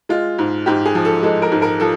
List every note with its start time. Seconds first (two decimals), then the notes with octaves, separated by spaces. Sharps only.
0.09 G#3 F4
0.39 G#2
0.66 G#2 G4
0.86 G#4
0.95 F3
1.05 A4
1.23 G#3 A4
1.42 A#4
1.52 G#2
1.62 A#4
1.80 F3 A4